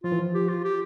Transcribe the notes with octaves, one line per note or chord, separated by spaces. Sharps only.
F3 F4
E3
F3
G4
F4
G4